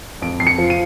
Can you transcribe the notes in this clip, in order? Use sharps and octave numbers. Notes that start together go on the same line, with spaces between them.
F2 D7
F2 C7
C#7
F3
D#7